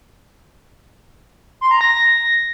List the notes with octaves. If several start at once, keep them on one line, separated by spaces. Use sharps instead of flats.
C6
A#5
A#6